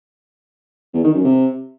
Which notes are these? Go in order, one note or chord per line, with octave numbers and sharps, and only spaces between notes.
E2
D#3
F#2
C3